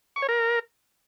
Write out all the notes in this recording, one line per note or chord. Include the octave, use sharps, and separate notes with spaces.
C#6
C#5
A#4